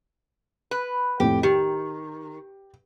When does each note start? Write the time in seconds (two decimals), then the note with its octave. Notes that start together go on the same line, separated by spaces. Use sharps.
0.71 B4
1.20 F2 A2 G4
1.43 D#3 G4